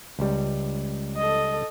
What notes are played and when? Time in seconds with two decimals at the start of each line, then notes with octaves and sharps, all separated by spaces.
0.19 C#2 G3
1.17 A4 D#5